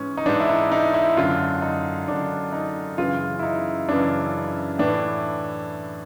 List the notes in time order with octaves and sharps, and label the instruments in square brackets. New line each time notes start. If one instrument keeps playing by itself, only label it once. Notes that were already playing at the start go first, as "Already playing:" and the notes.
Already playing: [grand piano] G#2 E3 C#4
D#4
G#2 E3 D4
E4
D#4
D#4
E4
F#2 D3 F4
D#4
F#2 D3 D4
D#4
F#2 C#3 E3 F4
E4
D#4
F#2 C#3 E3 D4
A2 E3 D4